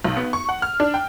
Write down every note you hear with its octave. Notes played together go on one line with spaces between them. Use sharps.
B1
B3
C#6
F#5
F6
D4
G5